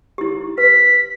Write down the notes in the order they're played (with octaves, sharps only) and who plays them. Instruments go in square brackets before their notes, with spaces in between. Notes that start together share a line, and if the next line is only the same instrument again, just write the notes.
[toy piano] E4 G4
[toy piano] B4 [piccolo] B6